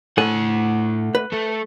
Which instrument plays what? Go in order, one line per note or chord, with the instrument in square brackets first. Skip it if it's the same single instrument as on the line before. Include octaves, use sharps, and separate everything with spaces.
[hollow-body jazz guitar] A2 A4 G#5 [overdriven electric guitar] A3 F#5
[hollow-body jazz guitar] B4
[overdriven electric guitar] A3 A4